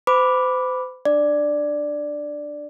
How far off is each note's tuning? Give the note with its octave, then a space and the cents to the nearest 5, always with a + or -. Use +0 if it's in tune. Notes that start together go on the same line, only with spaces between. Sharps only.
C5 -40 B5 +0 D6 +0
D4 +15 D5 +0